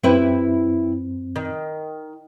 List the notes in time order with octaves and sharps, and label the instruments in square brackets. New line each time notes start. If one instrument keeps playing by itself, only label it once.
[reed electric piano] F#2 C4 [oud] E4 G4 B4
[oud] D#3